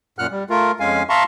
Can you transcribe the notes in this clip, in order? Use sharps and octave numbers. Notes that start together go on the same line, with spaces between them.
F#2 A#2 F#5 F6 F#6
G3
A3 F4 A#4
F2 G#3 C#4 F5 G#5
E5 F5 A5 A#5 C6 C#6